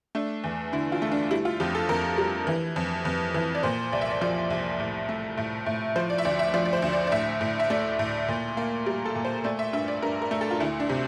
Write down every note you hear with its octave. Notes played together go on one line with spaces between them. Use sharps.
A3 D4
E2
D3 E4
F4
A3
D4
G3 E4
F4
F2 G4
A4
F2 A#4
G3
E3
F2
F2
E3
D5
A#2 C5
C2 D5
E5
D5
F3 D5
C2
A2
A3
A2
A2
F3 C5
D5
E5
D2 D5
E5
F3 D5
D5
C5
D2
D5
D5
A2 E5
A2
E5
A3 D5
A2
A#2
A#3
G3 A#4
A4
A#2
C5
A3 D5
E5
G2 E5
D5
G2 A#4
A#4
A3
A4
F4
D2 E4
D4
C3